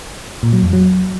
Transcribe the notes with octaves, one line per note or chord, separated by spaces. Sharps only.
A#2
F#3
F2
F#3